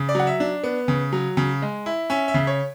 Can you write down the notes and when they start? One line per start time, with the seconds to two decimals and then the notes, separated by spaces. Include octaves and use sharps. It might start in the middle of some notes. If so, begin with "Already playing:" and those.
Already playing: C#3
0.09 D5
0.15 F#3 F#5
0.27 E5
0.40 D4
0.64 B3
0.88 C#3
1.13 F#3
1.37 C#3
1.62 G#3
1.86 E4
2.10 C#4 E5
2.28 E5
2.34 C#3
2.47 C#5